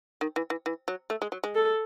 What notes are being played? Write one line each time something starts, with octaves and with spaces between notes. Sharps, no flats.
D#3
E3
E3
E3
F#3
A3
G#3
F#3
G#3
A4